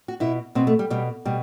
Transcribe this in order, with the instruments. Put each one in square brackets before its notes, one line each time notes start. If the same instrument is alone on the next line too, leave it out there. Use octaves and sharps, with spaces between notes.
[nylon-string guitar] F#4
B2 E4
B2 C4
A3
G3
B2 G3
B2 G3